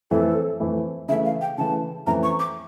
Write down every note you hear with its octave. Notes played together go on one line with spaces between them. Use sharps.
F2 E3 A3 E4 A4
F2 E3 A3 E4
C#3 E3 A3 E5
F5
G5
C#3 E3 A3 A5
F2 E3 A3 C#4 A#5
C#6
D6